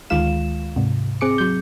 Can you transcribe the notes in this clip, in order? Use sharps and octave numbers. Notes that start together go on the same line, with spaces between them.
D2 D#3 G#3 F4 F5 E7
G#2 C3
C4 G#4 D6 C#7
F#3 G6